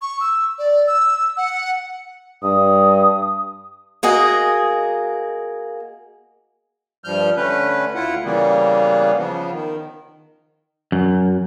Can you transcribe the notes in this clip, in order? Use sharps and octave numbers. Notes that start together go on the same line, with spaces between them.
C#6
E6
D5
E6
F#5
G2 D#6
A#3 F#4 G#4 D#5
G2 F3 G3 F6 G6
D3 A3 C#4 B4
D2 E4 F4 F#5
C#3 E3 G3 A#3 B3
C#3 F3 B3
D#3
F#2